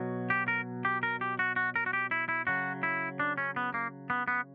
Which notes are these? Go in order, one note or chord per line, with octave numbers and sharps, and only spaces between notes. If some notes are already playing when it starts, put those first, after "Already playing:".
Already playing: B2 F#3
G4
A#4
G4
A#4
G4
F#4
F#4
A#4
F#4
G4
E4
E4
C#3 F#3 F#4
E4
D4
C#4
B3
A#3
B3
B3